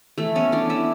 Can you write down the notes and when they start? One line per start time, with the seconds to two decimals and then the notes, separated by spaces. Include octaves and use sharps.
0.18 E3 A3 A4
0.35 B3 C#4 C#5
0.52 E3 D4 D5
0.69 B3 E4 E5